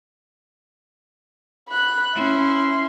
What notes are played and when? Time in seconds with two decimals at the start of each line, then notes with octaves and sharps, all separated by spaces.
1.69 B5 F#6
2.15 C#4 E4 C6